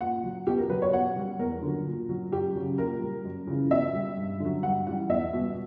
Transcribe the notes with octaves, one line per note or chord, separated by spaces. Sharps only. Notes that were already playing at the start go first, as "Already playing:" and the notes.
A#2 F#5
F#3
B2 G4
A#4
F#3 B4
C#5
B2 F#5
G3
E2 A#4
D3 F#3
A#2
F#3
F#2 G4
C#3 F#3
A#2 A#4
G3
F#2
C#3 E3
B2 E5
G3
G2
D3 F#3
G2 F#5
E3 G3 F#5
E2 E5
B2 G3